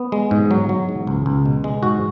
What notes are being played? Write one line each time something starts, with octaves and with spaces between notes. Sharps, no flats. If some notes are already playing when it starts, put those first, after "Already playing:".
Already playing: B3
G#3
G#2
F#3
F#3
G#2
C#2
C#2
B2
G#3
G#2 F#4